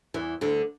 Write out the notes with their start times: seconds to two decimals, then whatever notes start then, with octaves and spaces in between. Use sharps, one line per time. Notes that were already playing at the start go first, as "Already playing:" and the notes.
0.14 E2 E3
0.41 D2 D3